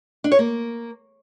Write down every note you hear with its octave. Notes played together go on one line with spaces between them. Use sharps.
D4
C#5
A#3